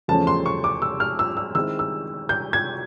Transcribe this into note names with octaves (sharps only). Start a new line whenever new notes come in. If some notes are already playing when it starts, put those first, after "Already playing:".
E2 C#3 F3 A3 C#4 A5
C6
C#6
D6
E6
F6
E6
E6
D#3 G#3 C4 E4 E6
E6
G6
G#6